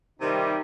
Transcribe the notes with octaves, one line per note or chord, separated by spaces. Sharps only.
C3 D#3 G3 D#4